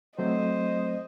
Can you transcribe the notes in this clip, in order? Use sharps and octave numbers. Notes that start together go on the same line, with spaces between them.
F#3 A3 C4 C5 D#5